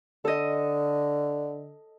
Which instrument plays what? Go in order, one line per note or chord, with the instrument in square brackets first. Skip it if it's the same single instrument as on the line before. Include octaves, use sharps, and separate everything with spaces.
[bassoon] D3 [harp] A4 D#5